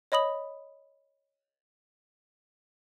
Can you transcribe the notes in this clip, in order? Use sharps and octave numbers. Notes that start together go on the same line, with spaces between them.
C#5 D#5 B5 D#6 F#7